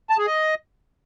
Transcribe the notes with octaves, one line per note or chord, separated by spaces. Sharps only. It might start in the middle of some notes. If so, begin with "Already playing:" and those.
A5
G#4
D#5